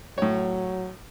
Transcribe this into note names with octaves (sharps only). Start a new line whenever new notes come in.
A2 F#3 C#5